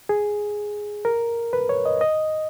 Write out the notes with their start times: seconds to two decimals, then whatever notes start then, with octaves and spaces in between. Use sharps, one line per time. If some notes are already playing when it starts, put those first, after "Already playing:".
0.09 G#4
1.05 A#4
1.53 B4
1.69 C#5
1.86 D#5
2.01 D#5